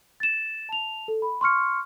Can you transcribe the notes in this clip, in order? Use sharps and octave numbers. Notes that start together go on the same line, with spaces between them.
A6 E7
A5 F7
A4
B5
C6 C#6 F6 C#7